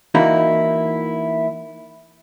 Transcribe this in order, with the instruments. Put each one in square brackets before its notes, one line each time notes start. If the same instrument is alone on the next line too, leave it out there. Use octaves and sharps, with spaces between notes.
[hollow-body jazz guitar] E3 A#3 D#4 E4 F#4